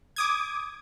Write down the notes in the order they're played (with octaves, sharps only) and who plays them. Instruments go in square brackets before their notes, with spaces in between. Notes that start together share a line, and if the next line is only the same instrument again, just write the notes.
[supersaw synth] D6 D#6 G#6